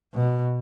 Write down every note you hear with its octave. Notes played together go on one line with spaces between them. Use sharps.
B2